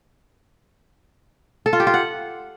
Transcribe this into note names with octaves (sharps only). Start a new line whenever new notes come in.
A4
F4
G4
F4
F#5